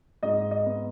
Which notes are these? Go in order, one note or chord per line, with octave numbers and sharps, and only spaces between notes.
G#2 D#5
D#5
B3